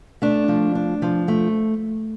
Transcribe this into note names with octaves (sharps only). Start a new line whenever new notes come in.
A3 D4
F3
D4
F3
A3